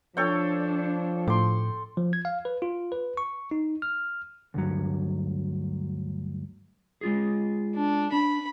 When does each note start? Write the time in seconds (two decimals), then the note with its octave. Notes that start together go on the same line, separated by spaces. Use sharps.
0.17 F3 D4 A4 C#5 G5
1.28 A2 C6 D6
1.97 F3
2.13 G#6
2.25 F5
2.45 B4
2.62 F4
2.92 B4
3.17 C#6
3.51 D#4
3.82 F6
4.54 D2 G2 F#3
7.01 G#3 F4 G#4
7.76 D4
8.12 D4 B5